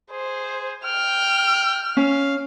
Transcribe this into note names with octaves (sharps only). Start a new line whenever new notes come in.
G#4 C5
G5 F6
C#4 F5